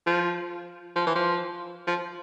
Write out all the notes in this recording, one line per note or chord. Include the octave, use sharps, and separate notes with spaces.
F3
F3
E3
F3
F3